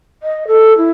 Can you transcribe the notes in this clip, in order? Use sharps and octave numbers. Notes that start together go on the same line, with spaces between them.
D#5
A4
E4